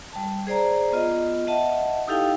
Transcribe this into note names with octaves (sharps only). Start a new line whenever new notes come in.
G3 A5
G#4 C5 D5 A#5
B3 F4 D#5
D#5 E5 F#5 A5
D#4 E4 G4 A4 F5 G5